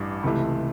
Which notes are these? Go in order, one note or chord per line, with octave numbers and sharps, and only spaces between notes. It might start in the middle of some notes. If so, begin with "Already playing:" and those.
Already playing: A1 G2 E3
C#2 C3 E3 A3